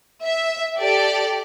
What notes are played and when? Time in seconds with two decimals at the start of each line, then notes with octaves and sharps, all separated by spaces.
0.24 E5
0.78 G4 A4 D5